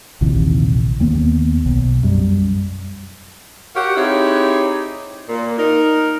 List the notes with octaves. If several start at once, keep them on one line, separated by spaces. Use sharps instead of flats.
A#1 D#2 C3 E3
D#2 A#3 B3
B1
F#2 G3
F#4 G4 A#4 C#5 F5 F#5
C4 D#4 E4 G4 G#4 C#5
A#2 A#3
D#4 A#4